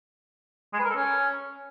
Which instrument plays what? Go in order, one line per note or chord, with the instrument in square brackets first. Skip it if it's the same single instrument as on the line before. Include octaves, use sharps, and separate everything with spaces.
[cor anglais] G#3
B4
A#4
A4
C#4